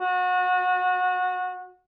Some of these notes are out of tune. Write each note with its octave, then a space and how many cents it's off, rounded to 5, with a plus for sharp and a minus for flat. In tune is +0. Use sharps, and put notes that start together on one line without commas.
F#4 -25